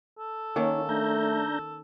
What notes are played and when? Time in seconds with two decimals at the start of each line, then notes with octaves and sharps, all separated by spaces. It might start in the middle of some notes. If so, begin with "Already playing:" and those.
0.19 A4
0.56 D#3 A#3 C#4 D#4 C#5
0.89 A3 D4 A#5 G6